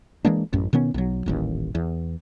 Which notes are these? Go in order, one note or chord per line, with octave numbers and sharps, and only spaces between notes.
E3 G#3 A#3 D4
A1 F#2
B2 D#3 B3 C#4
B1 F#3
D#1 A1 D#2
E2